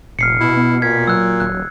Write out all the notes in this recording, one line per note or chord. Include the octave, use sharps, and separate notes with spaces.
F1 A#2 F6 C7 C#7
B2 E4
B3
A#2 G#6 B6
F#3 E6 F#6
D#1 F#6